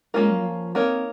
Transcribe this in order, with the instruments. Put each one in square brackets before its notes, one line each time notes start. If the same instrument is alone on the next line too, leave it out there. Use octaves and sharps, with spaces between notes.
[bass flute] G#3 [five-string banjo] A#3 C#4 F4 A#4
[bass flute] F#3
F#3
F3
[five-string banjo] A#3 D#4 A#4 C#5 [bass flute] C4